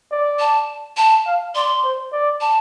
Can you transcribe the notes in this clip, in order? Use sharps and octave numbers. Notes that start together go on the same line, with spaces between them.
D5
A5
A5
F5
D5 C6
C5
D5
A5